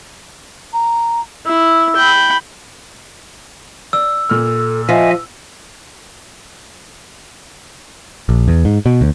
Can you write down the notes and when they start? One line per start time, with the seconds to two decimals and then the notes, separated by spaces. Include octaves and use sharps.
0.73 A#5
1.46 E4 E6
1.96 G5 B5
3.93 D5 E6
4.30 A#2 A4 F6
4.89 F3 D#5 E5 G#5
8.29 A#1
8.48 E2
8.65 G#2
8.86 B2
9.01 D2